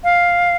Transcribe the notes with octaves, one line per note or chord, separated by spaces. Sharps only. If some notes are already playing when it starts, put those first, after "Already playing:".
F5